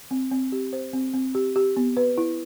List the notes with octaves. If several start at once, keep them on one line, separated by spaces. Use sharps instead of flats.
C4
C4
G4
C5
C4
C4
G4
G4
B3
B4
E4